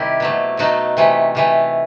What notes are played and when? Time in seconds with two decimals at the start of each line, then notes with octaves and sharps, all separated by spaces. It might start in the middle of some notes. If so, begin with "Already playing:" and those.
Already playing: C3 D#3 G3 E4 G4
0.20 B2 F#3 A3
0.57 B2 F#3 A3 D#4 F#4
0.97 C3 E3 A3
1.35 C3 E3 A3